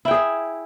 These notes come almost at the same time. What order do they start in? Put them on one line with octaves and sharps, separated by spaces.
E4 G5 G#4 E5